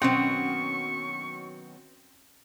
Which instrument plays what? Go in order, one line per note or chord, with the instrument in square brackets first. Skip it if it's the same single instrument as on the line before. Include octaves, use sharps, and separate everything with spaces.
[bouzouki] B2 D#3 F#3 [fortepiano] C4 [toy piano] C#4 [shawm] C#6